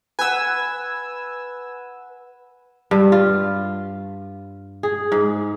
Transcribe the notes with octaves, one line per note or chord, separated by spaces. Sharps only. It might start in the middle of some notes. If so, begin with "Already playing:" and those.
B4 F#5 G#5 E6
G2
F4
G#4
G#2